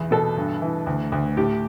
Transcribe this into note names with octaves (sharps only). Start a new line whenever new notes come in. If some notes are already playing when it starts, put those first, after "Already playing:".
Already playing: B1 E2
B2 A4
G2
E3
D2
D2
A2 G4